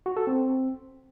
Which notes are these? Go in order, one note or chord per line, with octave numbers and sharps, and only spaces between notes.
F#4
A4
C4